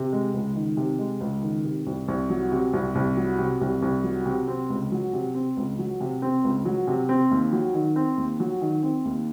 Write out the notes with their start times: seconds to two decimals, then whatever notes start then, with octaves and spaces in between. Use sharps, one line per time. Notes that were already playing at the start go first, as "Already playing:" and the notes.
Already playing: C3
0.13 G#3
0.34 C#2
0.55 D#3
0.77 C3
0.99 G#3
1.21 C#2
1.43 D#3
1.64 C3
1.86 C2
2.08 C2
2.30 F#3
2.52 C3
2.73 C2
2.95 C2
3.17 F#3
3.39 C3
3.61 C2
3.82 C2
4.04 F#3
4.26 C3
4.48 C4
4.70 C#2
4.92 F#3
5.13 C3
5.35 C4
5.57 C#2
5.79 F#3
6.01 C3
6.22 C4
6.44 C#2
6.65 F#3
6.87 C3
7.09 C4
7.31 D#2
7.53 F#3
7.74 D#3
7.96 C4
8.18 D#2
8.40 F#3
8.61 D#3
8.83 C4
9.05 D#2